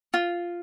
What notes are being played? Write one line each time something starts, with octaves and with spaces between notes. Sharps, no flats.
F4